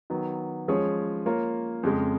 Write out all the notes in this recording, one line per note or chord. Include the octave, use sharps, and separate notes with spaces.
D#3 F#3 B3
F3 G#3 C#4 G#4 C#5
A#3 F4 A#4 C#5
F2 C#3 G#3